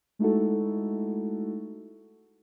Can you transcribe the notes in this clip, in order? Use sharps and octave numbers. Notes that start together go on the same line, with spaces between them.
G#3 A3 D#4 E4 F#4 A4